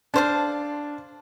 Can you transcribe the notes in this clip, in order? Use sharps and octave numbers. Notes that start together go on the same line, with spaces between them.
D4 A4 C5 F5 A5